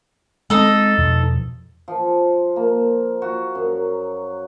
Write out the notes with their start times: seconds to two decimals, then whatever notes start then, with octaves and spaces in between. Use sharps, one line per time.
0.50 G#3 C4 D#4 A4
0.98 E2 B2 F3
1.88 F3
2.56 A#3
3.22 F#4
3.55 F#2